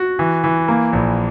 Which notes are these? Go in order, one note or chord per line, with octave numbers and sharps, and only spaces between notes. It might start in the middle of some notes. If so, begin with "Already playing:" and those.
Already playing: F#4
E3
E3
A#3
A#1